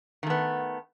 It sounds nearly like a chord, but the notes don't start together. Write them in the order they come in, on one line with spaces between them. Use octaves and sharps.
D#3 A3 B3